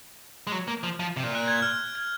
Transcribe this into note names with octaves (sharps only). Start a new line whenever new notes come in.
G#3
F#3
A#3
F3
F3
C3
A#2
F#6
G#6
F6
F#6
G#6